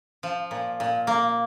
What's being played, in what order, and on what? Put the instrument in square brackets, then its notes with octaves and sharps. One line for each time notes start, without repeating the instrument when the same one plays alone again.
[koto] F3
A#2
A#2
A#3